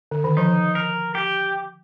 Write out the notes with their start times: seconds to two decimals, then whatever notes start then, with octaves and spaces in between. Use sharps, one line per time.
0.11 D3
0.24 D#3
0.37 F3 D#4
0.75 A#4
1.15 G4